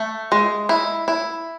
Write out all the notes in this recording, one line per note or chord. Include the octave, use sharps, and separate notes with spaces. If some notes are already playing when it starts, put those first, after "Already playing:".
Already playing: A3
G#3
E4
E4